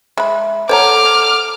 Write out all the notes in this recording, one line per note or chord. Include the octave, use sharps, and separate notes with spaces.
G#3 E5 B5
A4 C5 C#5 F#5 A5 A#5 D6 F6